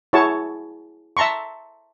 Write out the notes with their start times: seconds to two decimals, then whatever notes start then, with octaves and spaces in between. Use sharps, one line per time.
0.13 E4 F#4 G#4 C#5 A5 C#6
1.17 E5 A5 A#5 C6 C#6